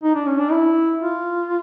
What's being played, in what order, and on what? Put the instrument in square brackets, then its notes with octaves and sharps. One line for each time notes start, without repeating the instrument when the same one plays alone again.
[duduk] D#4
D4
C#4
D4
E4
F4